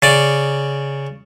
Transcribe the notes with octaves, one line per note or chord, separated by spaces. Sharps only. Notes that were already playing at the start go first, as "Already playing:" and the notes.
C#3 D5